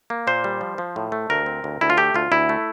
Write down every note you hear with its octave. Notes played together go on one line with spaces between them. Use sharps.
A#3
A#2 C5
G3
F3
F3
A2
A3
D2 A#4
C4
D2
D2 E4
F4
A3 G4
D2 F4
D2 E4
A3